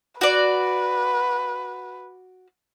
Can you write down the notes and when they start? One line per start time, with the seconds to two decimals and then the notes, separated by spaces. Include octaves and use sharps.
0.21 F#4 B4 D5